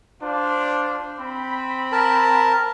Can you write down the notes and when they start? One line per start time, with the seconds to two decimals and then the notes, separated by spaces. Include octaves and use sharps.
0.22 D4 F4 C5
1.20 C4 B5
1.92 A#4 A5